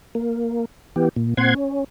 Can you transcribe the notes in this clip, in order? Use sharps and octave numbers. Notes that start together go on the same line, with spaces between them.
A#3
E3 B3 G4
A#2
A#2 C4 F#5 C6 G#6
C#4